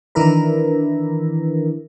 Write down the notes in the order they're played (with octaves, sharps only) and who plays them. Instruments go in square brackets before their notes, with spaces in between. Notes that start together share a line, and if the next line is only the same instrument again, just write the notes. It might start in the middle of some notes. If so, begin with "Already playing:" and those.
[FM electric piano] D#3 E3 D4 E4 A#4 B4